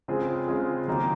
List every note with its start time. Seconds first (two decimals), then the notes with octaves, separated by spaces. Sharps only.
0.08 C#3 G#3 C4 F4 G#4
0.48 C#3 G#3 C4 F4 G#4
0.88 D#3 F#3 A#3 D#4